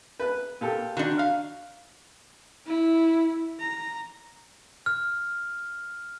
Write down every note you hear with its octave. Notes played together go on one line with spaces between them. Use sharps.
B4 F#6
A#2 G4 A4
D#3 D4 F#4
F5
E4
A#5
F6